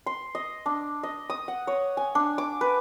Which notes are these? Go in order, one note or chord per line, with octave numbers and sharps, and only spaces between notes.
C6
D#5
D4
D#5
D#6
F#5
C#5
G#5
D4
D6
B4